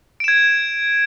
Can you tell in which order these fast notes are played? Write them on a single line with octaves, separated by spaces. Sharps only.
D7 E7 G#6